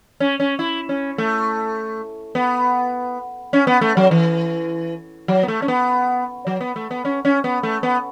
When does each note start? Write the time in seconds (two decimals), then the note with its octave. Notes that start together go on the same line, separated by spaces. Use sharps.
0.20 C#4
0.40 C#4
0.59 E4
0.89 C#4
1.18 A3
2.35 B3
3.53 C#4
3.67 B3
3.81 A3
3.97 F#3
4.11 E3
5.28 F#3
5.43 B3
5.48 A3
5.62 C#4
5.68 B3
6.47 F#3
6.61 B3
6.76 A3
6.91 B3
7.05 C#4
7.25 C#4
7.44 B3
7.63 A3
7.83 B3